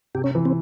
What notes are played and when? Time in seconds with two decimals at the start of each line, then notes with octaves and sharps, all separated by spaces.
0.14 C3 G4
0.24 C#4
0.35 E3
0.45 C4